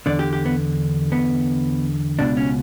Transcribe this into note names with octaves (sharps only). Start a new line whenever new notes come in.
E2 D3 D5
G4
G4
B3
B3
C#2 B2 D4
C#4